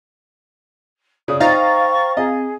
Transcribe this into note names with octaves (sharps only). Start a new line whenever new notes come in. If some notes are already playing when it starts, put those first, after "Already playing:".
C#3 D5 D#6
D#4 C5 F5 G5 A#5 C#6 A6
C4 G#4 D#5